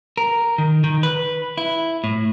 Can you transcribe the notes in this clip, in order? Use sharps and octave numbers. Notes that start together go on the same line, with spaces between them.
A#4
D#3
D#3
B4
E4
A2